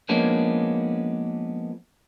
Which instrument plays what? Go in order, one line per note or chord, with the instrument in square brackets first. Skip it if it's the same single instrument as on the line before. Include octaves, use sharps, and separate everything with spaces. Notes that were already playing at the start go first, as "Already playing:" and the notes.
[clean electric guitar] F3 G#3 A#3 B3 C#4 D4